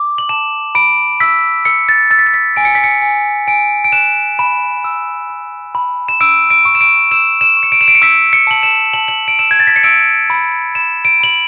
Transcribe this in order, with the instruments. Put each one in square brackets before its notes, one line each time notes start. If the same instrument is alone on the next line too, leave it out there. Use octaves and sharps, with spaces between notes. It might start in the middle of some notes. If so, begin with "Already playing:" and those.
Already playing: [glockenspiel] D6
F#7
A5 E7
B5 D7
E6 B6
E6 C#7
A6
E6 A6
B6
A6
B6
G#5 D7
C#7
B6
C#7
G#5
G#5 D7
D7
F#6 E7
B5 E7
E6
B5
B5
E7
E6 D7
D7
C#6
E7
D7
E6 E7
E7
C#6
C#7
D7
E7
D7
C#7
E6 B6
C#7
A5 F#7
E7
A5 F#7
F#7
D7
E6 E7
G#6
A6
B6
C#7
E6 D7
B5
B5 E7
D7
B5 F#7